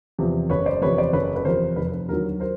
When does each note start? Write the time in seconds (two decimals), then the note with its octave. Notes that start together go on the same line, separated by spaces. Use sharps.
0.19 E2 C3 F3
0.50 F#1 B4 C#5
0.66 C5 D5
0.81 E2 C3 F3 B4 C#5
0.98 C5 D5
1.13 F#1 B4 C#5
1.36 B4
1.45 E2 C3 F3 A#4 C5
1.76 F1 B4
1.92 B4
2.08 D#2 D3 F#3 A#4
2.40 A#4 C5